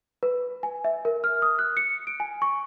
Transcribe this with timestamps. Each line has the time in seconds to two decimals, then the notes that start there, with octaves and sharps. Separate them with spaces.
0.23 B4
0.63 G#5
0.84 E5
1.05 A#4
1.24 F6
1.42 D#6
1.59 F#6
1.77 C#7
2.07 D7
2.20 G#5
2.42 C#6